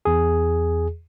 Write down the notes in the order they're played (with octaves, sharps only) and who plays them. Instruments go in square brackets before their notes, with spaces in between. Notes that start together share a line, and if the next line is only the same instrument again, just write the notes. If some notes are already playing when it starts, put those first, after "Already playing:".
[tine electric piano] E2 G#4